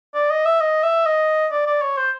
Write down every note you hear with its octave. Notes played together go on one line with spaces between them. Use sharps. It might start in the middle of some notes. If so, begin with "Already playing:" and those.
D5
D#5
E5
D#5
E5
D#5
D5
D5
C#5
C5